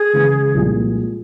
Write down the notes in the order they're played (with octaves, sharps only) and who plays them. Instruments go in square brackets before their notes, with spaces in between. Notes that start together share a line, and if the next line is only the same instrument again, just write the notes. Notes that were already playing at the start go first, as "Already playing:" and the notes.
Already playing: [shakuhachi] G#4
[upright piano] C#3 E3 G#3
C2 A#2 F3 G#3